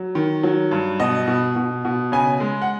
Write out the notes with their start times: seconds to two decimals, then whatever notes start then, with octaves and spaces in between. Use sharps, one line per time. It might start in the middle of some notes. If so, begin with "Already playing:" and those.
Already playing: F#3
0.15 D#3
0.43 F#3
0.71 G2
1.00 B2 D#5
1.28 B2
1.56 B2
1.85 B2
2.12 C#3 G#5
2.40 G#3
2.62 F#5